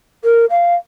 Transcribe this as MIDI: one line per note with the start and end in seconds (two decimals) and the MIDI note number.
0.24 0.45 70
0.50 0.74 77